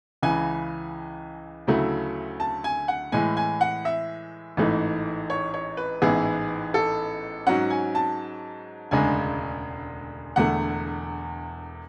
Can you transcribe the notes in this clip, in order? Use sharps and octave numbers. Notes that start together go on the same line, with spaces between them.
C#2 C#3 E3 G#5
D2 C#3 F#3 A3 E4
A5
G#5
F#5
A2 E3 G#3 G#5
G#5
F#5
E5
A1 G#2 E3 A3
C#5
C#5
B4
A1 G#2 E3 B3 E4 G#4
A4
G#2 F#3 C#4 F#5
G#5
A5
E1 D2 C#3 G#3 D4 G#5
E1 E2 D3 A3 F#5